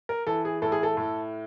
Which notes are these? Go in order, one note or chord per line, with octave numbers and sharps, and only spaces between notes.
A#4
E3 A4
G#4
A2 A4
G#4
A4
A2